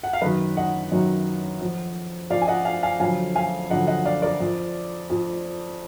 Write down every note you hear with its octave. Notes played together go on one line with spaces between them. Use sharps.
F#5
F5
F#2 D#3 F#3 B4 D#5
D#5 F#5
F#2 D#3 F#3
F2 F3
F2 F3 D5 F5
G#5
D#5 F#5
F5 G#5
F5 G#5
F2 D3 F#3 F5 G#5
F5 G#5
F2 D3 F#3 D#5 F#5
D#5 F#5
D5 F5
A#4 D5
F2 F3
F2 F3